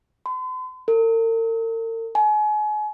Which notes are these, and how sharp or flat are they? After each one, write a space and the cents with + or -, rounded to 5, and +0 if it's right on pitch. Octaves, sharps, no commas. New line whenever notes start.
C6 -45
A#4 -45
G#5 +35